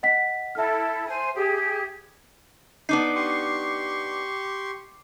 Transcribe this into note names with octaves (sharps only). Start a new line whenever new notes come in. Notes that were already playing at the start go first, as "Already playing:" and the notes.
D#5 F#5 B6
E4 A4 E5 F6
C5 G#5
G4 G#4
B3 D4 D#4 D6 C7
G4 C6 C#6